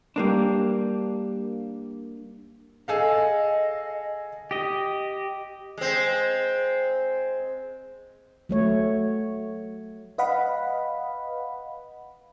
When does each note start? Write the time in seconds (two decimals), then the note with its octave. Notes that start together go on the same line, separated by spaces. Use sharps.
0.16 G3 A#3 D4
2.88 G#4 A4 D#5 F5
4.51 G4 D#5
5.78 G#3 C4
8.49 F#3 A3 C#5
10.18 B4 D#5 F5 F#5 B5